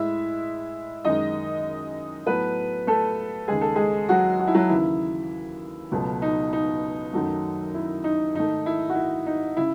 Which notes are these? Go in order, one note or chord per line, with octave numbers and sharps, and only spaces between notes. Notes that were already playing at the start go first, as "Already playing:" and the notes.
Already playing: A2 G#3 E4 E5
F#2 D#3 G#3 D#4 D#5
A2 F#3 A3 B3 B4
A3 A4
D#2 C#3 G#3 G#4
A4
G#3 G#4
F#3 F#4
F#4
E4
F#3 F#4
D#2 C#3 E3 E4
C#2 B2 F#3 A3
D#4
D#4
F#2 D#3 F#3 A3
E4
D#4
G#2 D#3 A3 D#4
E4
F#4
E4
D#4
C#3 E4